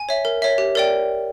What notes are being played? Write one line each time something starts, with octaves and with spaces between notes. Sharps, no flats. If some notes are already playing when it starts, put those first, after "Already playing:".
Already playing: G#5
C#5 E5
A#4
C#5 E5
G4
A#4 D5 G5